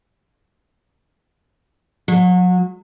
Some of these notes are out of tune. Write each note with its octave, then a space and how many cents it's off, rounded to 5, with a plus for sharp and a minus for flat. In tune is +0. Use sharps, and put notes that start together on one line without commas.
F#3 -35